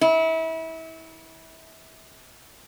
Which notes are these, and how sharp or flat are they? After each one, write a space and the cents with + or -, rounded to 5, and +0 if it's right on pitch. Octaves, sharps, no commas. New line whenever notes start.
E4 -30